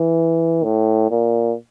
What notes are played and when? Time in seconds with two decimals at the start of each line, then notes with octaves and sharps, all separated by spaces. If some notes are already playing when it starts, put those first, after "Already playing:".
Already playing: E3
0.64 A2
1.11 A#2